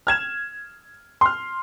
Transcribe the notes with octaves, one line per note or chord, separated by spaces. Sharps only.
F6 G#6 E7
C6 F6